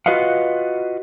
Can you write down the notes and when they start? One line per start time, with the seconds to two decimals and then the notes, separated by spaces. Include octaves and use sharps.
0.06 F4 F#4 B4 D#5 F5 F#5